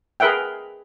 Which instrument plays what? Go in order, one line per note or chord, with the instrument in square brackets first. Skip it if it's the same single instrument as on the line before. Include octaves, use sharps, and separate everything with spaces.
[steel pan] G#4 A#4 B4 E5 F#5 G5